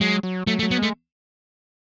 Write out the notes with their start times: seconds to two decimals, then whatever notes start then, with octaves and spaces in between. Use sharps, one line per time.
0.01 F#3 G#3
0.23 F#3
0.47 F#3 A3
0.59 A3
0.63 F#3
0.71 B3
0.79 G#3 A3